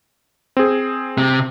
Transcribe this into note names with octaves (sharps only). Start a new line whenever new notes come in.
C4 G#4
C3